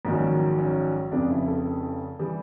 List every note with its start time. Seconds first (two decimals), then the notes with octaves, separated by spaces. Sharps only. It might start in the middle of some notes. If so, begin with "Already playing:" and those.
0.05 A#1 G#2 D#3 F#3 C#4
0.59 C#4
1.12 F1 F2 C#3 D4
1.30 E4
1.48 A4
2.19 E3 G3